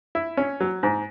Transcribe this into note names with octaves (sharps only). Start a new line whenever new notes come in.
E4
C#4
F#3
G#2